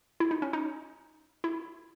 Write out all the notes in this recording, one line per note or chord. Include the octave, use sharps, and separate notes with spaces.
E4
D#4
C#4
D#4
E4